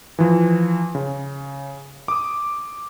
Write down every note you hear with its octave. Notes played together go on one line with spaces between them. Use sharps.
E3 F3
C#3
D6 D#6